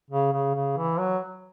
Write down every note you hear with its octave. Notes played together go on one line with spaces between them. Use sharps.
C#3
C#3
C#3
E3
F#3